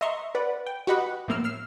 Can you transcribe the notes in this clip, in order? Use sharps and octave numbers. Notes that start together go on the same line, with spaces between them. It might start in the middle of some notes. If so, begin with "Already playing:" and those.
D#5 E5 A#5 C6 C#6
B4 D5 F#5
G5
F#4 G4 B4 D#5 F#5 B5
A2 F3 A#3 E6 F6
E6 F6 C7